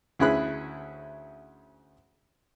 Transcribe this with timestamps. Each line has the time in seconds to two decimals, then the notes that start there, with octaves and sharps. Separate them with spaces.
0.19 D2 C#4 E4 G#4 B5 F#6